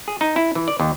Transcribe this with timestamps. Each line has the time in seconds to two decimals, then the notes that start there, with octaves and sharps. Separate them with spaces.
0.08 G#4
0.21 D#4
0.36 E4
0.55 E3
0.68 D5
0.80 D#2